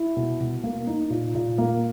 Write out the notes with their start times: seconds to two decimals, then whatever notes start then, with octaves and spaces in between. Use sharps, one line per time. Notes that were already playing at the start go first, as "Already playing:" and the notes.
Already playing: E4
0.16 B2
0.40 B2
0.63 A#3
0.87 D#4
1.10 A#2
1.35 A#2
1.58 A#3